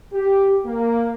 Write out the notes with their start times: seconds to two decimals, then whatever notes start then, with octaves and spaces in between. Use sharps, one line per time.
0.13 G4
0.66 A#3